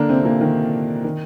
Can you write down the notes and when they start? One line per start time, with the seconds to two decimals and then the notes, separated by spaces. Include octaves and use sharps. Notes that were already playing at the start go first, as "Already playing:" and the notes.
Already playing: D3 A#3 D4 A#4
0.09 C3 C4
0.20 C4
0.25 A#2 A#3
0.41 D#3
1.04 D#3